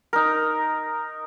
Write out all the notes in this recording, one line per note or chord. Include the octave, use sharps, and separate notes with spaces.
D#4 A#4